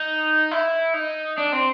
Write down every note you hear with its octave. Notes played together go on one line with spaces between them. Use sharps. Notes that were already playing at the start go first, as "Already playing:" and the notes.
Already playing: D#4
E4
D#4
D4
C4